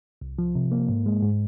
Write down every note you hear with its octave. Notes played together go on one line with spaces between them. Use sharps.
C2
F3
C3
A#3
G#2
G#3
G#2